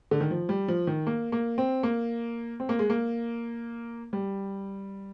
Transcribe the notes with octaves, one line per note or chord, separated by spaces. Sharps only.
D3
D#3
F3
G3
F3
D#3
A#3
A#3
C4
A#3
C4
A#3
G#3
A#3
G3